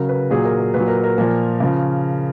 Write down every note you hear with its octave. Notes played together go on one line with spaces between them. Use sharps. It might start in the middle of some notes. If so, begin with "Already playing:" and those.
Already playing: C#3 F#3 A#4
B4
A#2 F#3 G#4
A#4
A#4
A#2 B4
F#3
A#4
A#4
A#2 F3 A#4
C#3 F3